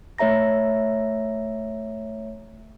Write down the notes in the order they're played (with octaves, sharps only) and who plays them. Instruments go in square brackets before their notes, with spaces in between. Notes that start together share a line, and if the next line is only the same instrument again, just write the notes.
[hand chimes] A3 C#5 E5 A#5 A#6